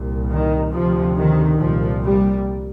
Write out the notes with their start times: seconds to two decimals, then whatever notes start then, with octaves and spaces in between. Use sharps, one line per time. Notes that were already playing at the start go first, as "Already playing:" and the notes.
Already playing: C2 A#2
0.30 D#3
0.72 D2 C3 F3
1.16 D#3
1.58 C2 A#2 F3
2.02 G3